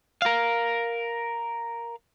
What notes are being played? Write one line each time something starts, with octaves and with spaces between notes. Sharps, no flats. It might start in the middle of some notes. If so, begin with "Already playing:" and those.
A#4 F5